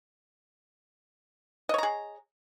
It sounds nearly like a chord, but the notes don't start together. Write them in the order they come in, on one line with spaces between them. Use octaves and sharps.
D#5 C#5 A#5 G#4